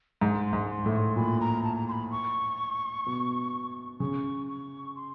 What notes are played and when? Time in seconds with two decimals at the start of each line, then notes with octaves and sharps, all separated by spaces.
0.21 G#2 C6
0.45 C6
0.53 G#2
0.70 C6
0.86 A2
0.94 C#6
0.97 C6
1.16 A#2 B5
1.40 A#5
1.64 A5
1.76 A#5
1.88 C6
1.92 B5
2.11 C#6
3.06 B2
4.00 C#3 C#6
4.49 C#6
4.96 C6